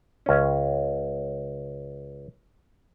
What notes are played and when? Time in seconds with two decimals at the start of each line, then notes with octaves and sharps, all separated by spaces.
0.26 C#2 C#4